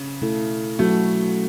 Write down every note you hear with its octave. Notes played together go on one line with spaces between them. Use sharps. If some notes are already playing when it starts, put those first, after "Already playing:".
Already playing: C#3
B2 A3 E4 A4
B2 F#3 A3 C#4 F#4 A4